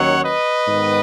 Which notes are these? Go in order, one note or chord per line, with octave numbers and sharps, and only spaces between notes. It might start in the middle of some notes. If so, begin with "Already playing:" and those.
Already playing: D#2 D#3 F#3 C#4 C#5 F#5
B4 D#5
G#2 D#3 B3